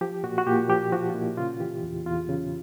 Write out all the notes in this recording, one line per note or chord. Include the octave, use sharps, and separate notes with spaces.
F3 G4
A#2 F#4
F#4
A#2 G4
F3 G4
F3 F#4
F4
A#2 E4
C#3 F4
E3 G4
E2
E2 F4
C#3